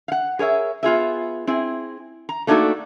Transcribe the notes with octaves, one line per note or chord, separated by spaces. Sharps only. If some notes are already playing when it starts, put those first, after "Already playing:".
F5 F#5
G#4 A#4 C#5 E5
B3 F4 G#4 E5
C4 E4 G#4
A#5
A3 A#3 D4 D#4 F#4 A4